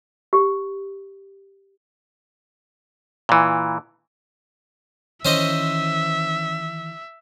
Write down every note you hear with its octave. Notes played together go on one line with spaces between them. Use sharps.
G4
A#2 E3
D#3 E3 C#4 C5 D#5 E5